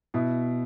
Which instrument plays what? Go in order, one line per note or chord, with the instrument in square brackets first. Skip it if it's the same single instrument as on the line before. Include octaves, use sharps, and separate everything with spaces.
[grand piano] B2 E4